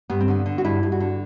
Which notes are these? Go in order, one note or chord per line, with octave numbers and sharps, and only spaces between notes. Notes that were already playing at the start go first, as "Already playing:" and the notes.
G2 B3
C4
D3 B3
D3
F#4
G2 E4
G2
F#4
D3